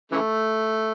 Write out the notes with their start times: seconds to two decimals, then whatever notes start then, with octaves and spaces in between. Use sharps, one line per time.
0.11 C#3 E3 A3